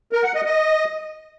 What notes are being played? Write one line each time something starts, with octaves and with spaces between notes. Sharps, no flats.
A#4
F#5
D#5
D#5